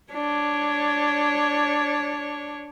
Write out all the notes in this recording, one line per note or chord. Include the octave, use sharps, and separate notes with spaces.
D4 C#5